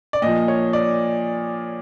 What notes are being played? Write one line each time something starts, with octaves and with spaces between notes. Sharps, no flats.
D5
A#2 F3 D#5
C#5
D5